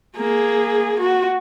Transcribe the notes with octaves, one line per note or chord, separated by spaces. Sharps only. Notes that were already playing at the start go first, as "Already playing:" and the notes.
A#3 G#4
F#4